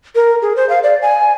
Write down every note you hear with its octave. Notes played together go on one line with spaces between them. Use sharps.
A#4
G#4
C5
F5
D5
G#5